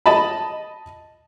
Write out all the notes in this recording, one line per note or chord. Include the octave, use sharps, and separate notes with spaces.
D#5 A5 B5